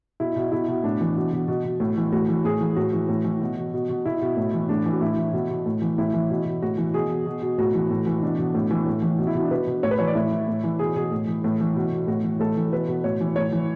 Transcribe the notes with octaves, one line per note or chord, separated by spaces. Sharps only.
B2 E4
B2
B2 E4
B2
A2 D4
E3
B2
B2
B2
B2
A2
E3
A2 F#4
E3
A2 G#4
E3
A2 F#4
E3
A2
E3
B2
B2
B2
B2
B2 E4
B2
A2
E3
A2 D4
E3
F#4
A2 E4
E3
B2
B2
A2
E3
A2 E4
E3
B2
B2
A2 F#4
E3
B2 G#4
B2
B2
B2
A2 F#4
E3
A2
E3
B2 D4
B2
A2
E3
A2
E3
B2
E4
B2
D4
B2 B4
B2
A2 C#5
B4
E3 C#5
D5
A2 E4
E3
A2
E3
B2 G#4
B2 G#4
A2
E3
A2
E3
B2
B2
A2 F#4
E3
A2 A4
E3
B2 B4
B2
A2 C#5
E3
A2 C#5
E3